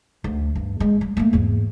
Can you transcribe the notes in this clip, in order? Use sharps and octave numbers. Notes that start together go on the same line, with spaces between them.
D2
G2
G#3
G3
A3 A#3
E2 G#2